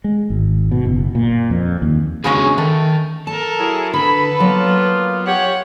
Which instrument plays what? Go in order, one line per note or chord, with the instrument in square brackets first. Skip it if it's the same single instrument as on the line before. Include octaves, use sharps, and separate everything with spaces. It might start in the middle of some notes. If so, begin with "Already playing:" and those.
[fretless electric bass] G#3
G#1
B2
F#1
A#2
F2
D#2
[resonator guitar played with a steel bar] C#3 G#3 C#4 [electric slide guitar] D4 F#4 G#4
[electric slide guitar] D#3 [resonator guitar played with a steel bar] A3
[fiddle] A4 A#4 [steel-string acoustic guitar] A5
[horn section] F#3 E4 G#4
[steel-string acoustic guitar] D3 [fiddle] A4 B4 [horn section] B5
[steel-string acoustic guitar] F#3 [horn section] A#3 B3 F4
[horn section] G4 C#5 [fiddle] F#5